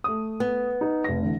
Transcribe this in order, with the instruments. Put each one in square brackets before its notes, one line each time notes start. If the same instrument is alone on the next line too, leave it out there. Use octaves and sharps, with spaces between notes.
[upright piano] A3 D#6
[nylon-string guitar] B3
[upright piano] D#4
F1 A#6
D3 E3